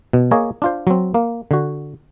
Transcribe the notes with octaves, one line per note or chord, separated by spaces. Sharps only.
B2
A#3 G#4 C#5 D#5
D4 F4 C5
F#3 C4
A#3
D3 F#4